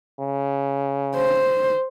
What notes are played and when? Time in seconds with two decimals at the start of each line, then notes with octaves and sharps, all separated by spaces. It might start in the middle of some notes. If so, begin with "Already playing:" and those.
0.21 C#3
1.16 C5